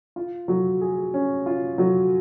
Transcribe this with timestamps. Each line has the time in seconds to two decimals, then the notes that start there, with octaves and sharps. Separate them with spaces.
0.16 F4
0.48 F#3
0.81 G#4
1.14 C#4
1.46 F4
1.78 F#3